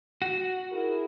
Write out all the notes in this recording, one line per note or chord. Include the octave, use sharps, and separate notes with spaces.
F#4
E4 G#4 A#4